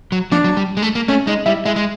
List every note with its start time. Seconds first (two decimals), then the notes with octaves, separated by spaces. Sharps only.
0.12 F#3
0.32 F3 D4
0.44 F#3
0.57 G3
0.77 G#3
0.82 A3
0.95 A#3
1.08 A3 C#4
1.27 G#3 D#4
1.46 G3 E4
1.65 G#3 E4
1.76 G#3